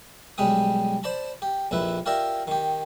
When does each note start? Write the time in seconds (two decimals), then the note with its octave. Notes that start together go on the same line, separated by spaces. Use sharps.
0.38 B1 G3 G#3 G4 D#6
1.03 C5 D5 A5 B5
1.42 G4
1.71 A#1 F2 E4 B4
2.06 F4 G4 A#4 D5 E5
2.47 D#3 G4